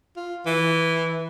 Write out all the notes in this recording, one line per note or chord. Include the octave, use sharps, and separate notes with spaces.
F4
E3